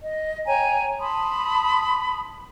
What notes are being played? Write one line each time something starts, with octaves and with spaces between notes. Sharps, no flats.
D#5
C#5 G5 G#5 A#5
A5 B5 C6 D#6